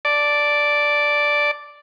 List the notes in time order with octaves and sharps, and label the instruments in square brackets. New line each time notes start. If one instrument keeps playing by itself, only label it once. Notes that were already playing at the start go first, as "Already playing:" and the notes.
[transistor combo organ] D5 A5